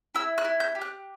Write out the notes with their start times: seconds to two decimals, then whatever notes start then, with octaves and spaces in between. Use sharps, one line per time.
0.15 E4 E6
0.38 F#6
0.45 E4
0.60 G6
0.75 G4
0.81 F#6